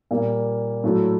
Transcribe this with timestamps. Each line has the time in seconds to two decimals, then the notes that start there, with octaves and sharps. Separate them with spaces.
0.11 A#2 G3 A#3
0.84 A2 F#3 A3